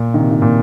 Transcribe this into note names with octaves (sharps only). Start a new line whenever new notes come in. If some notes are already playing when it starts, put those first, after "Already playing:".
Already playing: A#2
D#3
C3
D#3
A#2